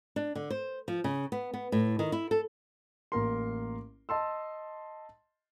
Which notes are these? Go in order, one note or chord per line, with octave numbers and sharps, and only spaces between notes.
D4
D3
C5
F3
C#3
B3
B3
A2
D#3
E4
A4
A1 A#3 A#4 C6
D#5 A5 C6 E6